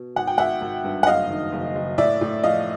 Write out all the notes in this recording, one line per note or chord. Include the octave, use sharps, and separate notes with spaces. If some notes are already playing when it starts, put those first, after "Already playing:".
Already playing: B2
G#1 F#5
G5
G#1 E5 F#5
G#1
G2
F#5
F#1 D#5 F5
D#3
F#1
F#1
A2 D5 E5
A2
F3 D#5 F5